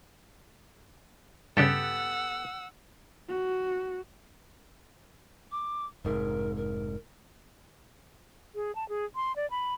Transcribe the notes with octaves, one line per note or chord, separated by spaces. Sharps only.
G2 C#3 B3 G4 A4 F#5 E6
F#4
D6
F1 G#2 A#4
A#4
G#4
A5
G#4
C6
D5
B5